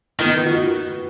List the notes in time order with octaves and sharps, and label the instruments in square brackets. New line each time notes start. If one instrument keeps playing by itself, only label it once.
[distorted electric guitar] D#3 [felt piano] B3 D#4
[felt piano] D#4 F#4